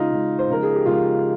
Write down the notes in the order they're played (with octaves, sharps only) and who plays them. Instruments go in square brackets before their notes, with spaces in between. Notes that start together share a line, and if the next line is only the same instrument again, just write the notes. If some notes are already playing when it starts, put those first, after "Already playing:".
Already playing: [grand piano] C#3 G#3 D#4 F4
C#3 G#3
C5
C#3 F3 G#3 A#4
G#4
G4
C#3 F3 G#3 F4